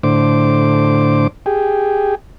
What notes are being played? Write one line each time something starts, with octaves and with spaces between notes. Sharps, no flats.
A2 D3 C5 D6
G4 G#4